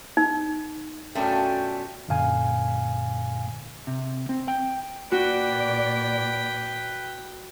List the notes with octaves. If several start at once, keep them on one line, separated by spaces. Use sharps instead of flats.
D#4
F#2 B2 A3 C#4 D4 F4 G5
F#2 A#2 D3 F5 G#5
C3
C4
G5
A#2 F#4 B4 D5 G5